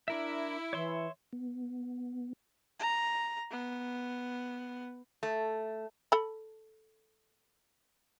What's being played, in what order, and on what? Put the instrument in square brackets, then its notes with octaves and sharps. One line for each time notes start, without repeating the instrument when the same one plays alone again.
[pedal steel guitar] D4 A#4 E5 [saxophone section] E4
[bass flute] E3 [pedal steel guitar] C#5 E5 C6
[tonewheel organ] B3
[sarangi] A#5
B3
[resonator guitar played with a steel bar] A3
[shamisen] A4 B5